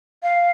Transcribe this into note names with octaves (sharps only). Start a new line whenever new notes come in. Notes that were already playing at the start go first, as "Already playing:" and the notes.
F5